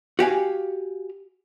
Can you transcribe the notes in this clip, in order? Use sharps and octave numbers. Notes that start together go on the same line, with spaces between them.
F#4 G4 F5 G#5